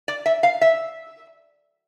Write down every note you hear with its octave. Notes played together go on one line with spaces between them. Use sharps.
D5
E5
F5
E5